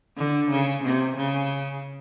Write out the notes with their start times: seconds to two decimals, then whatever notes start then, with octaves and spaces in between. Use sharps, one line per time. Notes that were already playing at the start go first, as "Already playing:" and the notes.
0.17 D3
0.50 C#3
0.83 C3
1.16 C#3